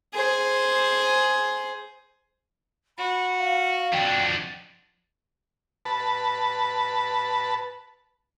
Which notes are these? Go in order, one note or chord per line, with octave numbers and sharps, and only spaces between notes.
G#4 C5
F#4 B5
F5
F2 D4 G5
B4 A5